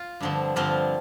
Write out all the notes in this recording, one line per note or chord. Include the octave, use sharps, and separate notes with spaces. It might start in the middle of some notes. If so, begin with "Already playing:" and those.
Already playing: F4
G2 D3 F3 C4
G2 D3 F3 C4 F4